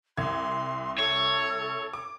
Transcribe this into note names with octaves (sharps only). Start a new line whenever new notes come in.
C2 C6 G#6
A4 C#5
D6